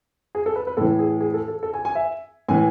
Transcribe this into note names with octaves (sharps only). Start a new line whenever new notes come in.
G#4
A4
B4
B4
A2 E3 A4
G#4
G#4
A4
A4
A4
G#5
G#5
E5
A2 E3 G#5